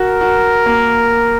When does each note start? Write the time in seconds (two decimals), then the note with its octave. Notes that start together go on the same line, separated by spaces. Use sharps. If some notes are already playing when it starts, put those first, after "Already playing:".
Already playing: F#4 A#4
0.21 F#4
0.66 A#3